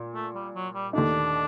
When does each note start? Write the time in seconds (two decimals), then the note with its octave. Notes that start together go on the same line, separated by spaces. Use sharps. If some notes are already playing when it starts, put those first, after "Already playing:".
Already playing: A#2
0.14 A3
0.35 G3
0.55 F#3
0.74 G3
0.93 D#2 D3 A3 D4 D#4